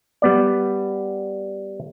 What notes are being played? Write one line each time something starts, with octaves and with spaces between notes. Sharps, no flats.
G3 B3 D5